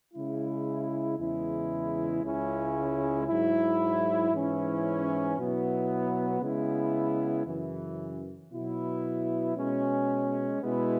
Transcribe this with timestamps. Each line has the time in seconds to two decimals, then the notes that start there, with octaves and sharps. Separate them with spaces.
0.13 C#3 G#3 E4
1.18 E2 C#3 G#3 E4
2.23 C#2 C#3 G#3 C#4 E4
3.28 G#2 F#3 E4
4.32 G#2 E3 C#4 E4
5.38 B2 F#3 B3 E4
6.42 C#3 G#3 B3 E4
7.46 F#2 C#3 E3
8.52 B2 F#3 B3 E4
9.56 B2 G#3 C#4
10.61 B2 G#3 B3 E4